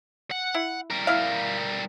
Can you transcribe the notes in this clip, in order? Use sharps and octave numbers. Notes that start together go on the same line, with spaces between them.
F#5
E4
G3 A#4
E4 F5